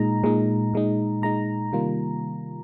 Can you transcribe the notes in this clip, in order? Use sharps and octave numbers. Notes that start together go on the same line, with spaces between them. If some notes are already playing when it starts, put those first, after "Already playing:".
Already playing: A#2 G#3 D#4 A#5
A#2 G#3 D#4
A#2 G#3 D#4
A#2 G#3 D#4 A#5
C3 D#3 G3 A#3 F4